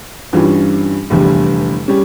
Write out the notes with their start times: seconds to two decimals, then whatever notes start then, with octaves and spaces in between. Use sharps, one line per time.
0.33 G2 E3 G3 C#4 F4
1.10 F1 E2 D3 G3
1.88 G3 C#4